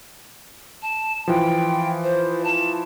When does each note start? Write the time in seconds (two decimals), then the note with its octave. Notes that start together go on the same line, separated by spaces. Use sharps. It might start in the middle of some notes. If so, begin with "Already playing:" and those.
0.82 A5
1.28 E3 F3 G5
2.03 C5
2.44 A5